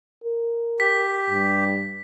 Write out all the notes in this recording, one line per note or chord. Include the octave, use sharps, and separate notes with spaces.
A#4
G4 B6
G2